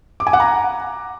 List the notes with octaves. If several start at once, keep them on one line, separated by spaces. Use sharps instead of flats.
D6
G#5
F#5
A#5